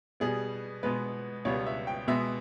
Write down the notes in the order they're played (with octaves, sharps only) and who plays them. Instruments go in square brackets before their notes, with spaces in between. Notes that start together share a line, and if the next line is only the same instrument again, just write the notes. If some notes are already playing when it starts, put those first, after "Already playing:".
[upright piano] B2 G3 B3 G#4
B2 G#3 B3 B4
C#2 B2 G3 B3 C#5
E5
G5
B2 G#3 B3 E5